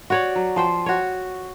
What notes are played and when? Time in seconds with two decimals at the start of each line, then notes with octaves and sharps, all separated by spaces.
0.10 F#4 C#5 D5
0.36 F#3
0.56 F3 C5 G5
0.86 F#4 C#5